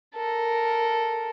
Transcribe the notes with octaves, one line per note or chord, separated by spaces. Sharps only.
A4 A#4